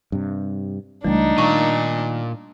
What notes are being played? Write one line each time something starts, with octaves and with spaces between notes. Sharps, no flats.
G2 C3
C#2 E3 G3 A3 D4 D#4
A#2 D#3 A#5 C#6